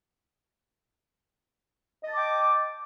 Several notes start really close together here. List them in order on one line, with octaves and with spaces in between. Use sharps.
D#5 A5 D6 G5